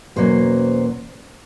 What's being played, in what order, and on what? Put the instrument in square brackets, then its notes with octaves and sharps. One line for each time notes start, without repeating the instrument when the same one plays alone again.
[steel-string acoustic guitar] E2 B2 F#3 A#3 C#4 C5